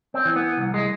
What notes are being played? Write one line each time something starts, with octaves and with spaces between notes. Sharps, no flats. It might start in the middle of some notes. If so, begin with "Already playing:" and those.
C4
E3
B3
C2
G#3